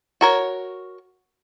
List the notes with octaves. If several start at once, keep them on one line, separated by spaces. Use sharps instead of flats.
F#4 A#4 C#5